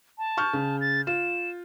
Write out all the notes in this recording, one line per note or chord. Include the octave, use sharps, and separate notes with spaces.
A5
C#6 F6 G6
C#3
A6
F4 E7